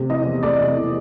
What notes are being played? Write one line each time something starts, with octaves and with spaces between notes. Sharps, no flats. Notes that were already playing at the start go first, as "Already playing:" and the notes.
Already playing: C3 A3
E3 D#5
E2
A3 D5
C3
E3